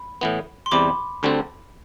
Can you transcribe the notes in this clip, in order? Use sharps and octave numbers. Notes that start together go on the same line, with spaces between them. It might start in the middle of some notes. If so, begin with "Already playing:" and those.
Already playing: B5
A2 E3 B3
C6
E2 C3 G3 B5 D6
D2 D3 G3 C4